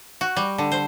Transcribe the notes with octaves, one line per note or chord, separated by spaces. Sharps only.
F#4
G3
D3
C5